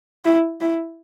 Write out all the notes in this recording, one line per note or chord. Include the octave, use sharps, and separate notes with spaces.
E4
E4